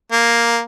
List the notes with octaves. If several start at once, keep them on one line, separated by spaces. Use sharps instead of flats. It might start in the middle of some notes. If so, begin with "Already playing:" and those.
A#3